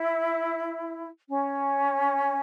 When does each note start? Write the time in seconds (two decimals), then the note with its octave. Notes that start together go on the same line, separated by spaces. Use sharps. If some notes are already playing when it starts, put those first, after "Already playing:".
Already playing: E4
1.27 C#4